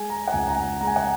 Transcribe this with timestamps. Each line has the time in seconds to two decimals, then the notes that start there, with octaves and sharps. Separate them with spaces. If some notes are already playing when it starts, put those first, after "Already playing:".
Already playing: G#3 G#5
0.09 A#5
0.27 F#5
0.33 C#2 G#5
0.48 A#5
0.56 G#5
0.81 G#3 A#5
0.87 G#5
0.96 F#5